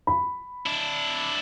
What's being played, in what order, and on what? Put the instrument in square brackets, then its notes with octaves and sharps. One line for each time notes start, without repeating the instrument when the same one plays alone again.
[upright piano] B5
[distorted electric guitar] D4 E4